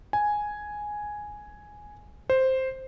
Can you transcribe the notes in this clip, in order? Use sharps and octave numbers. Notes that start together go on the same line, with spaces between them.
G#5
C5